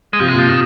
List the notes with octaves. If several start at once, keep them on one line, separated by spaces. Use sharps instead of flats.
G#3
C3 F3
G#3
A#2 F3
A#2 D#3